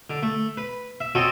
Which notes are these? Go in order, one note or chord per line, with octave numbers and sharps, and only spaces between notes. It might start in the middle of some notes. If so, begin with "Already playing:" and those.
D3
A3
B4
E5
C4 F#4 A4 C#5 D#5